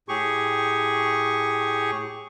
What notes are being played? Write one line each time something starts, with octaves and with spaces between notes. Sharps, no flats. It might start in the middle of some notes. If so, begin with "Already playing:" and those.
A2 G4 G#4 C#6